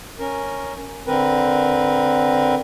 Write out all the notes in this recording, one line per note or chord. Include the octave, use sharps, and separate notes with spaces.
C#4 A#4
D3 C4 A#4 B4